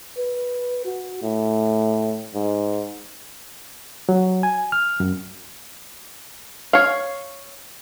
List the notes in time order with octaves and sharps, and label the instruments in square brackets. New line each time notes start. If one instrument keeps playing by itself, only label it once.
[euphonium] B4
F#4
A2
G#2
[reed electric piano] F#3
G#5
F6
F#2
[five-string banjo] C#5 F5